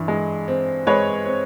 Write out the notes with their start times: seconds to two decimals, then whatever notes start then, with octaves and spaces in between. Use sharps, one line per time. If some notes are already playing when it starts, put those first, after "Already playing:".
Already playing: G2 E3
0.08 G#3
0.48 C4
0.87 G#3 B4 C#5
1.26 C4